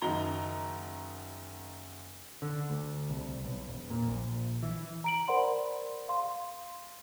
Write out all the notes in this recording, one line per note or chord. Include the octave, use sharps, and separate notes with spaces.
F#1 D#3 F#3 D#4 A#5 G7
D3
D2
C2
B1
E1
A#2
A#1
E3
A#5 D7 F#7
A#4 C5 D5 F#5 B5 C6
F5 C6